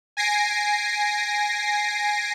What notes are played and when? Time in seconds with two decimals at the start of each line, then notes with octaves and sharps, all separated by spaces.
0.17 G#5 A#6 C7 D7